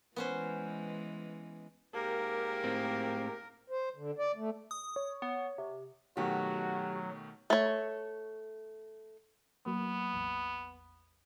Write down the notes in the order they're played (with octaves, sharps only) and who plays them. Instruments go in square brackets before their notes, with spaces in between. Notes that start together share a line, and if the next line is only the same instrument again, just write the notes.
[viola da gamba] E3 G#3 [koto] B3 C#4 C5
[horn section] G#2 A#3 G4 [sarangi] A#4
[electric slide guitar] A2 C4
[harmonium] C5
D3
D5
A3
[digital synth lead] D#6
[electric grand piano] C#5
[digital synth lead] B3
C3
[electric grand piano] B2 D#3 A3 [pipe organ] F#3 [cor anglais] F#4 [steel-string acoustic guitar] G4
[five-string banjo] A3 C#5
[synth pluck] F#3 A#3 [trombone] B3
[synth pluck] A1 E2